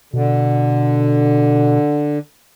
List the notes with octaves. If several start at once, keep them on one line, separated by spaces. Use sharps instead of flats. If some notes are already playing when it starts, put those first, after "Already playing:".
B2 D3